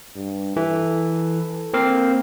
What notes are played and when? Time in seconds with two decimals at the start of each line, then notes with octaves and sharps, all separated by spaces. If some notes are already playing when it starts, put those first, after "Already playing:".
0.16 G2
0.56 E3 A4
1.74 A#3 C4 F5